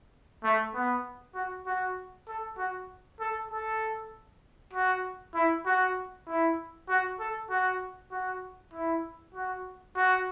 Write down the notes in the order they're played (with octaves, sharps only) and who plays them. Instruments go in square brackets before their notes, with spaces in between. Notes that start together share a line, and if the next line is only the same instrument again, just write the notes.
[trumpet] A3
B3
F#4
F#4
A4
F#4
A4
A4
F#4
E4
F#4
E4
F#4
A4
F#4
F#4
E4
F#4
F#4